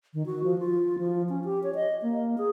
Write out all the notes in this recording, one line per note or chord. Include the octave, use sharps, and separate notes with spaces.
D#3
F#4
F3
F4
F3
C#4
G4
C#5
D#5
A#3
G#4